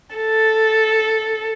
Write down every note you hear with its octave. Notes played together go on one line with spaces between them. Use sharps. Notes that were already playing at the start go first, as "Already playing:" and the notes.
A4